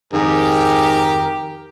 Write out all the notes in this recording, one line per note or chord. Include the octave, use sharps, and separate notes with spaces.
F2 G#2 D#3 G4 A#4